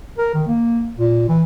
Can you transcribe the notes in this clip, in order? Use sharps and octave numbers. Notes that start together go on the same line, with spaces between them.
A#4
D#3
A#3
A#2
E3